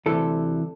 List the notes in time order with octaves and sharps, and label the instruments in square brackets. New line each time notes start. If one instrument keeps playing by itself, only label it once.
[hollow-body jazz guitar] D2 C3 E3 G3 A4